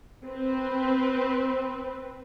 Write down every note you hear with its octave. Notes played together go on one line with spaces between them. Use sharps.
C4 B4